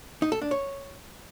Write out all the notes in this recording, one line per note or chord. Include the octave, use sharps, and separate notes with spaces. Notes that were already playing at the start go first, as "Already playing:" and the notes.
D#4
A4
D4
C#5